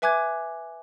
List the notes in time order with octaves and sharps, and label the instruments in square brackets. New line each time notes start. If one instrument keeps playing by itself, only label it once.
[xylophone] B4 E5 G#5 D6 F#6 G#6